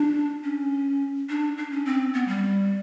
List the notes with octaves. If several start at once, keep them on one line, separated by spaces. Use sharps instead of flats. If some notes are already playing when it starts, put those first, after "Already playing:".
Already playing: D4
C#4
D4
D4
C#4
C4
B3
G3